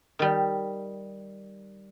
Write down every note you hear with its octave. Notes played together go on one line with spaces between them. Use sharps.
D#3 G3